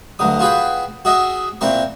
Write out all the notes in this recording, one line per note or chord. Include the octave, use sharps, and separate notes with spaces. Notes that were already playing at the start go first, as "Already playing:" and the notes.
D2 G2 F#3 D#6
F4 F#4 G#4 B4 G5
F#4 G#4 D#5 E5
A#2 E3 C4 A#4 C#6